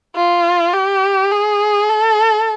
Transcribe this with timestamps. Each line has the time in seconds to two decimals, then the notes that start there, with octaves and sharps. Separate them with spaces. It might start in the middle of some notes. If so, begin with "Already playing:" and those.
0.16 F4
0.74 G4
1.32 G#4
1.89 A4